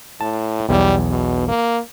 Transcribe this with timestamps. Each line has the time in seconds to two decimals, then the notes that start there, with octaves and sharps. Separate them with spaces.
0.21 A2 A5
0.69 B1 E2 G3
1.10 B2
1.48 A#3